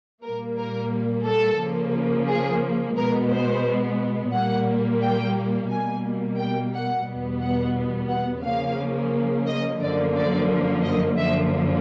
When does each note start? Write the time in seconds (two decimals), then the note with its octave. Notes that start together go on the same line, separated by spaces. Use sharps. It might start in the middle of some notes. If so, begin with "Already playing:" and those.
0.23 A#2 G3 A#3 A#4
0.58 A#4
1.25 A4
1.59 C#3 F3 A#3
2.28 G#4
2.97 B2 G#3 B3 A#4
3.31 C5
4.33 A#2 G3 A#3 F#5
5.02 G5
5.70 B2 G3 A#3 G#5
6.39 G5
6.74 F#5
7.08 E2 B2 G3 B3
7.42 F#5
8.10 F#5
8.44 C#3 F3 A#3 F5
9.47 D#5
9.81 F#2 D3 F3 A#3 D5
10.16 D5
10.84 D#5
11.18 F#2 D3 F3 A#3 E5